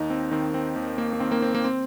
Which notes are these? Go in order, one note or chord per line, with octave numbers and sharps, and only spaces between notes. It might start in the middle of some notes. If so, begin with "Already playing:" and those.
Already playing: D#2 D#4
C4
D#3 C4
C4
D#2
A#3
A#3
D#3 C4
A#3
C4
A#3
C4